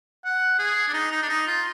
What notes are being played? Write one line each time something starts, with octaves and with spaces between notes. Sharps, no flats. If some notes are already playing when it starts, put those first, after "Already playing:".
F#5
G#4
D4
D#4
D#4
D4
D#4
F4